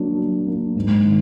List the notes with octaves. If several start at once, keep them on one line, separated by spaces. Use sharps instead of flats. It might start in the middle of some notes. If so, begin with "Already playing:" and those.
Already playing: F#3 A#3 D4
F#3
A#3 D4
G#2
D#3